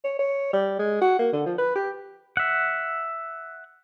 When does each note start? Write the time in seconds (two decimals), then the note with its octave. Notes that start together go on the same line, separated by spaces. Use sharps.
0.04 C#5
0.19 C#5
0.53 G3
0.79 G#3
1.02 F#4
1.19 A#3
1.33 D3
1.46 F3
1.58 B4
1.76 G4
2.37 E5 F#5